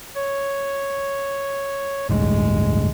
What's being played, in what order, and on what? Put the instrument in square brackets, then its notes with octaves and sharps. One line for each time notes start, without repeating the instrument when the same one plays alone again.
[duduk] C#5
[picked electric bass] A1 D2 G2 [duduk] G#3